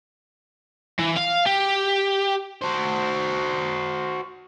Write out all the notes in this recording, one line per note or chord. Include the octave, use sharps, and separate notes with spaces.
E3
F5
G4
F#4 C5